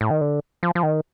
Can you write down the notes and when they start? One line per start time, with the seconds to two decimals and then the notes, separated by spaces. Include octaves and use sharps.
0.01 A2
0.10 D#3
0.21 D3
0.63 F3
0.75 F3
0.83 D#3